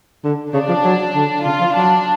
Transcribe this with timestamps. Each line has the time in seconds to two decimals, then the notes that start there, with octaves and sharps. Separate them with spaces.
0.24 D3
0.54 C#3 D4
0.69 F3
0.84 F#3
1.15 D3
1.45 C#3 F4
1.60 F3
1.75 F#3 D4